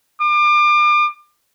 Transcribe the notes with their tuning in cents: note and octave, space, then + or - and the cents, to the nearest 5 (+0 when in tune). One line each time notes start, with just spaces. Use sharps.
D6 +35